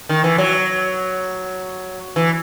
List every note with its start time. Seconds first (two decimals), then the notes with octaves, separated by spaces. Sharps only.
0.09 D#3
0.24 E3
0.38 F#3
2.16 E3